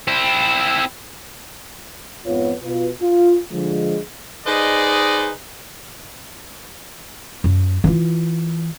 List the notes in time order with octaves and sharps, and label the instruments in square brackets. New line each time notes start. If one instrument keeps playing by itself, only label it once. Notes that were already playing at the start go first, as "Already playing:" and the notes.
[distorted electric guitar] C4 E4
[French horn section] F2 G#2 B3 F4 B4 C#5
B2 F4 B4
F4
D3 F3 G#3
[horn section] D#4 G#4 B4 C5 D5 D#5
[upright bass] F#2
E3 F4